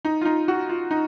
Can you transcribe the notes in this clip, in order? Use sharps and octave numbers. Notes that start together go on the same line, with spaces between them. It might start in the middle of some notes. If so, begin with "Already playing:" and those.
D#4
F4
D#4
F#4
F4
D#4